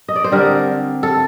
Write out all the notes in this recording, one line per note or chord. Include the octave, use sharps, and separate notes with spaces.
D#5
D5
C5
D3 G3 C4 A#4
A4